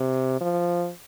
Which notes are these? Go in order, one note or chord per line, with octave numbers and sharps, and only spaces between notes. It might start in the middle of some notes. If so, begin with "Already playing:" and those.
Already playing: C3
F3